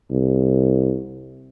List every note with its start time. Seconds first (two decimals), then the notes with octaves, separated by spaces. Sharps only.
0.11 C2